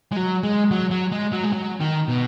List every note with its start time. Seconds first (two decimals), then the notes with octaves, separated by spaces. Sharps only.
0.12 G#3
0.17 F#3
0.43 G#3
0.71 F#3
0.91 F#3
1.12 G#3
1.33 F#3
1.44 G#3
1.53 F#3
1.80 D#3
2.08 B2